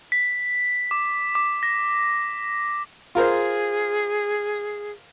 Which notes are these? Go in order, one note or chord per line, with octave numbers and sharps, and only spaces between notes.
B6
D6
D6
A#6
F4 G#4 A#4 C5